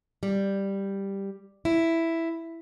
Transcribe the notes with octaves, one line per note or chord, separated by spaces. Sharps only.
G3
E4